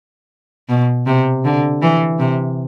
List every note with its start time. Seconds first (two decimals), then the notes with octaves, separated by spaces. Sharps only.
0.69 B2
1.07 C3
1.45 D3
1.82 E3
2.19 C3